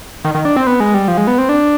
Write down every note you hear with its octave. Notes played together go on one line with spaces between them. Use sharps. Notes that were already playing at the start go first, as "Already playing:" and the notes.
D#3
D#3
D4
C4
B3
G#3
G3
F3
G#3
B3
C4
D4